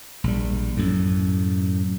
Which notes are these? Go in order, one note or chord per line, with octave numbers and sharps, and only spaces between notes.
A#1 G3
F#2 A2